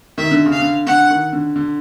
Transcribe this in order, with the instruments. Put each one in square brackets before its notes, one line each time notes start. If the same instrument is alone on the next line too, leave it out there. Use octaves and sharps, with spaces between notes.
[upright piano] D#3 [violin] E5
[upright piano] D3
C#3
[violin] F5
[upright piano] D3
[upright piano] D3 [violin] F#5
[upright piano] D#3
D3
D3